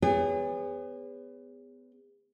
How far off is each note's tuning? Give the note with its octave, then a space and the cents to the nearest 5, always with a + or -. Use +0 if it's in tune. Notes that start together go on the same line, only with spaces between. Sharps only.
B3 +30 G#4 -35 C#5 +30